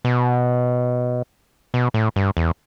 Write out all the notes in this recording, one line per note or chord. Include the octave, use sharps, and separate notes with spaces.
B2
B2
A2
G2
E2